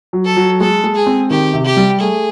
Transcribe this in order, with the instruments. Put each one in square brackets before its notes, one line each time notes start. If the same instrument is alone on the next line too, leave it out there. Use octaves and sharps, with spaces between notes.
[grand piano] F#3
[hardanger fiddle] A4
[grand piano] F#3
[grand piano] G#3 [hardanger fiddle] A4
[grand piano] G#3
[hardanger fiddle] G#4
[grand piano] C4
[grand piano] D#3 [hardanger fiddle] G4
[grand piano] C3
[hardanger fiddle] G4
[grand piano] G3
[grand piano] A3 [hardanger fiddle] G#4